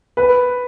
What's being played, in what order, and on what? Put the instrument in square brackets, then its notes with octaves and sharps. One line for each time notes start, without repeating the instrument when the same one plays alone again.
[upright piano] B4